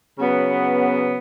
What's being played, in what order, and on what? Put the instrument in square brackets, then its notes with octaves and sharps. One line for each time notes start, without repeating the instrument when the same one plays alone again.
[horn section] C#3 F#3 B3